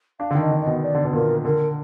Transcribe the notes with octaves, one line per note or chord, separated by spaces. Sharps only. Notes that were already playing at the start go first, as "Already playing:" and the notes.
D4 F5
D3
D#3
D#5
D3
D#5
B2
D5
D3
B2
A#2 A#4
D3 A#4